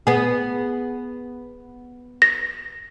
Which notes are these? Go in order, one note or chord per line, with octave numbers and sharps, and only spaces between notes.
B3 G#4
A#6